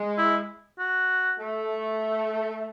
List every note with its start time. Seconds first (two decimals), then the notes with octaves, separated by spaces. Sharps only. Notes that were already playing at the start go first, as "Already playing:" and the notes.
Already playing: G#3
0.18 E4
0.79 F#4
1.39 A3